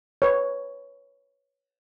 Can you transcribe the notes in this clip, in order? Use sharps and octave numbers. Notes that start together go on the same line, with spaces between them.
B4 C#5